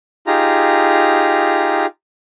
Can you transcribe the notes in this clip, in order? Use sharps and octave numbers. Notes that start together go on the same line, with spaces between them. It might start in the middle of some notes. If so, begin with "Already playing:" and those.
D#4 F4 G4 G#4 A#5